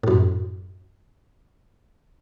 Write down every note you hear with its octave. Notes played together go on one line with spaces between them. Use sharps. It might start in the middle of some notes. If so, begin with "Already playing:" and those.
F#2 A2